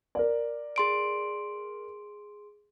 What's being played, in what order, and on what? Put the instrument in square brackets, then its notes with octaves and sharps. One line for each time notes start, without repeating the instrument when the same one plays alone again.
[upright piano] A#4 D5
[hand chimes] G#4 C6 D7